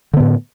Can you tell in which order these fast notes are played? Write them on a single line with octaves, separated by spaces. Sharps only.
D3 B3 A2